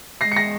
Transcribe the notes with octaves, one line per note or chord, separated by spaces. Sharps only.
G#3 A#6 C7
C#7
A#6 C7